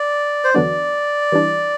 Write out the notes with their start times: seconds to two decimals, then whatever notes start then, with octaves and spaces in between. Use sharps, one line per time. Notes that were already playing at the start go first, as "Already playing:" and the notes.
Already playing: D5
0.44 C5
0.54 E2 D3 F#3 B3 D4 D5
1.32 E3 G3 D4